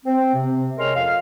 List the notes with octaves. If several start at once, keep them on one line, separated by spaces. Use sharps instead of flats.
C4
C3
G#3 C#4 A#4 C6 F6
F2 F5